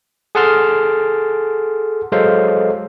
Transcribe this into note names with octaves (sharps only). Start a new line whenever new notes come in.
G#4 A4 F#5 A5 C6 F6
F#3 G#3 A4 C5 F5